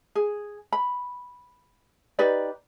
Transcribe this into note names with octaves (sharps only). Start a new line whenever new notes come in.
G#4
B5
D#4 G4 B4 D5